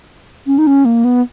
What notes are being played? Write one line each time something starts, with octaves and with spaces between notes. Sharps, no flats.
C#4
D#4
C#4
A#3
B3